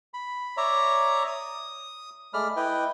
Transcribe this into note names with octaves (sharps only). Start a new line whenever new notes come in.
B5
C#5 D5 E5 A#5
D#6
G#3 A3 D5 B5 F6
E4 B4 D#5 G5